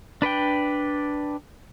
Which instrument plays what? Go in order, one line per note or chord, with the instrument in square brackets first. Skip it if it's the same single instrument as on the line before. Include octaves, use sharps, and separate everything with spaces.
[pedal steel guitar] D4 B4 D5 G5